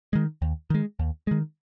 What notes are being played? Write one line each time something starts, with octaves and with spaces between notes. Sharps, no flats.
D#3 G#3
D#2
D#3 G#3
D#2
D#3 G#3